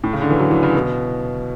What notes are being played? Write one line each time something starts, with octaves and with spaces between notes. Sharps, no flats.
A2
C#3
D3
E3
F#3
E3
C#3
B2